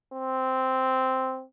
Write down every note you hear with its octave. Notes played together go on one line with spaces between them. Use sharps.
C4